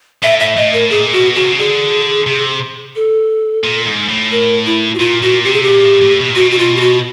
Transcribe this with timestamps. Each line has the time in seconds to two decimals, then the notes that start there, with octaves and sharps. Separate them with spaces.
0.22 A2 E5
0.40 E5
0.57 A2 D#5
0.73 A#4
0.90 A#2 G#4
1.13 B2 F#4
1.35 C#3 F#4
1.44 C3
1.51 C#3
1.58 D3 G#4
2.27 C3
2.95 A4
3.64 A#2
3.85 G#2
4.08 A2
4.32 A#4
4.66 E4
4.94 F#4
4.99 A#2 F4
5.22 A#2 F#4
5.44 C3 G4
5.53 G#4
5.63 G4
5.68 A#2
5.85 A2
6.02 A2
6.19 B2
6.29 A#2
6.35 B2 F#4
6.51 F#4
6.58 F4
6.76 G4
6.81 F#4